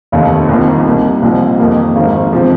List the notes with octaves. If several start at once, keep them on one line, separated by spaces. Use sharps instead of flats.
F1 D#2 D#3
C2 C3 D#3 A#3 F4
C2 C3 G3 A#3
C2 A#2 F3 C4 D#4
F2 D#3 A#3
G#1 G#2 D#3 G#3
C3 F3 G#3